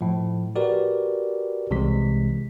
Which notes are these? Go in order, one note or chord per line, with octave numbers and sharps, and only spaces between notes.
A2 F3
F#4 G4 A#4 B4 D5
C2 C3 E3 G#3 B6